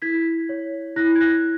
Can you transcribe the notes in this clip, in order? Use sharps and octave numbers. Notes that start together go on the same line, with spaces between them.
E4 G#6 B6
C#5
E4 F#6 A#6
G#6
F#6 A#6